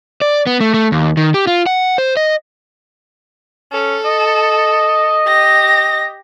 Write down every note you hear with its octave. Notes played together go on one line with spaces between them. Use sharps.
D5
B3
A3
A3
D#2
D#3
G4
F4
F#5
C5
D#5
C#4 A4
D#5
G4 A#6